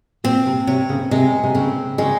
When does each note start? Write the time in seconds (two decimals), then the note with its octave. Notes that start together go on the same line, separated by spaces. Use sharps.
0.24 A#2 C4
0.46 C3
0.67 C3 C#5
0.89 C#3
1.11 C3 G#3
1.44 C3
1.55 C#3 C4
1.98 C#3 G#3